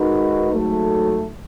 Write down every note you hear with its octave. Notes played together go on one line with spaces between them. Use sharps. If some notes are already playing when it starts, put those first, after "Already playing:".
Already playing: D#3 G#3 D#4 F#4 B4
G#2 F#3 A3